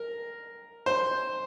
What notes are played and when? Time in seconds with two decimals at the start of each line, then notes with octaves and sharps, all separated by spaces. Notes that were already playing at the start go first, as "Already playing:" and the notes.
Already playing: A#4
0.86 C5